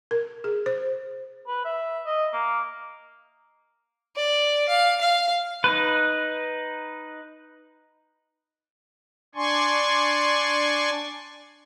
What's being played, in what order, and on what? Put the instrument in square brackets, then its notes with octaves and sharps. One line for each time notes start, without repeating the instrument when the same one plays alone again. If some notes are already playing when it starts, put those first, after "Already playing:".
[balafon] A#4
G#4
C5
[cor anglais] B4
E5
D#5
A#3
[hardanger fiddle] D5
F5
F5
[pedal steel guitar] D#4 B4
[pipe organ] D4 D5 G#5 C6 C#6